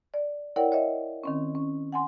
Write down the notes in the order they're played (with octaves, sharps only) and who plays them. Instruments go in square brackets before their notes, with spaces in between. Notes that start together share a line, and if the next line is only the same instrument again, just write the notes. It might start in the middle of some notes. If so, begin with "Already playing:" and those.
[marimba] D5
E4 A#4 C#5 D5 F#5 G5
C#5 D#5 E5
D#3 C4 C#4
C#4
F#5 G#5 C6